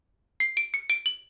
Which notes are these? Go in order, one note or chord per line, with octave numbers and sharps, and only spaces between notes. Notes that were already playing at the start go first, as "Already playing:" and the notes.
C7
D7
C#7
D7
F#7